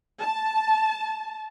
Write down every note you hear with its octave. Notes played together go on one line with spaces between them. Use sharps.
A5